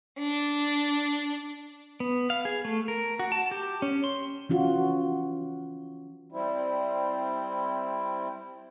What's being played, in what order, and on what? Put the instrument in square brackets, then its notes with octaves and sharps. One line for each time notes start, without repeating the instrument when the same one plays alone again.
[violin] D4
[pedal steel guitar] B3
F5
G#4
A3
A#4
F#4
A5
G4
C#4
C6
[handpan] E3 C#4 F4 F#4
[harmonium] G3 C4 E4